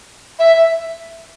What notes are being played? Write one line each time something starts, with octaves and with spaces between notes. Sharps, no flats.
E5